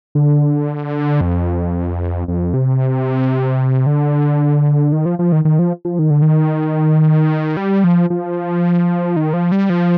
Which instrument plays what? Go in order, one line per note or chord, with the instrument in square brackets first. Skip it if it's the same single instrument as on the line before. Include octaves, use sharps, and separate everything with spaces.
[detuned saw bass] D3
F2
F2
C3
D3
D#3
F3
F3
D#3
D#3
F3
F3
D#3
D3
D#3
G3
F3
F3
D#3
F3
G3
F3